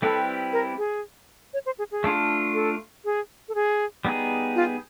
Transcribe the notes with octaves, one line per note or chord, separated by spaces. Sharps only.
G3 C4 E4 G4 A4 B4
A#4
G#4
C#5
C5
G#4
G#4
A3 D4 F4
A4
G#4
A4
G#4
G3 B3 D#4 G#4
F4